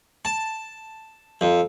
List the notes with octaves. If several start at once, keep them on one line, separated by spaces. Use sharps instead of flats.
A5
F2